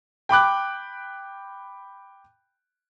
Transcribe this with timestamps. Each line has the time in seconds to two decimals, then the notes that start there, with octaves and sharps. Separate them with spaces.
0.29 G5 B5 D6 F#6